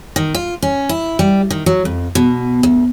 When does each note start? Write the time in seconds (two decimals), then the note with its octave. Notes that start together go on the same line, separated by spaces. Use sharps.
0.16 D#3
0.35 F4
0.62 C#4
0.89 E4
1.19 G3
1.50 D#3
1.66 F#3
1.85 F2
2.15 B2
2.63 D2